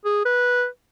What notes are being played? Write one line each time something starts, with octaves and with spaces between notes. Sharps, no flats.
G#4
B4